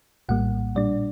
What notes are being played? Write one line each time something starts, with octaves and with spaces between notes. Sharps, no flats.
A#1 A2 G3 A#3 F#5
A#2 G3 D4 D5